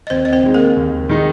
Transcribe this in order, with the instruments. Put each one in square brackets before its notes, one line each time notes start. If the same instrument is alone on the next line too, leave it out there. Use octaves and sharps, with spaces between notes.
[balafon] D#5
[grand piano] D#2 [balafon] C4 C5
[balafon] D#5
C4 C5
[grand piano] D#3 G#3 D#4
[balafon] A#3 A#4
[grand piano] D#2
D#3 G#3 D#4